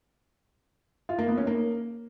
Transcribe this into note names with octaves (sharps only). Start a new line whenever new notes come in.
F4
A#3
B3
C#4
A#3